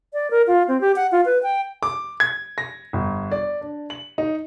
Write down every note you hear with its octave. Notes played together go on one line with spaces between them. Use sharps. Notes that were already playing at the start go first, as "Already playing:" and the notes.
D5
A#4
F4
C4
G4
F#5
F4
B4
G5
D6
G#6
A#6
G1
D5
D4
F#7
D#4